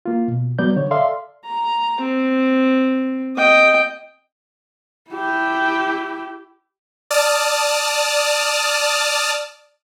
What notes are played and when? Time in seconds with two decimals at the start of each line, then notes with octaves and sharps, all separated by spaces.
0.06 A#3 F4
0.28 B2
0.59 F#3 G3 B3 D5 G6
0.76 D3 C#5
0.91 A4 D5 E5 F5 C6
1.45 A#5
2.01 C4
3.37 D#5 G5
5.11 E4 G4
7.11 D5 A5 D#6 F6